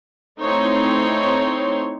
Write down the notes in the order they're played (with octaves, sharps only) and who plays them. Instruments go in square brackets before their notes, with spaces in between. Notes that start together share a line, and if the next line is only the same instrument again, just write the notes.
[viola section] A3 C4 D#4 E4 C#5 C6